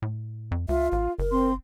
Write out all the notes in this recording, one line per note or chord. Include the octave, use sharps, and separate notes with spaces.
A2
F2
C#2 F4 E5
A1 F5
F#1 A#4
C4 C6